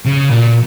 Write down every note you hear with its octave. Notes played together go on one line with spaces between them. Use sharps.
C#3
A#2